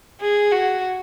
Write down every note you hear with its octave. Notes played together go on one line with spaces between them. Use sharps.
G#4
F#4